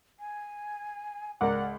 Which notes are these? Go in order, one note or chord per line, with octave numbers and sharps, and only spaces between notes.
G#5
C#2 A#4 D5 F#5 D6